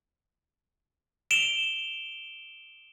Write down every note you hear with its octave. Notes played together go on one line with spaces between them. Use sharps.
D7 E7 F7 G7